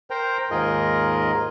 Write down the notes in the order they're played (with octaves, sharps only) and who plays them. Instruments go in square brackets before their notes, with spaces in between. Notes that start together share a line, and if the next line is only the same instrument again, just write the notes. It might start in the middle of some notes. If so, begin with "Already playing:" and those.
[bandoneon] A#4 C5 G5 A#5
D#2 G#2 F4 G#4 A#4 D#5